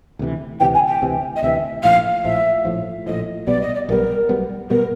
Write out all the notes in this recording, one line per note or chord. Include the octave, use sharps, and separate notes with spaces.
D2 C3 E3
D2 C3 E3 G5
G#5
G5
D2 C3 E3
D#5
D2 C3 E3 E5
A#1 A2 F3 F5
A#1 A2 F3 E5
A#1 A2 F3
A#1 A2 F3 D#5
B1 B2 G3 B3 D5
D#5
D5
B1 B2 G3 B3 A#4
B1 B2 G3 B3
B2 G3 B3 A#4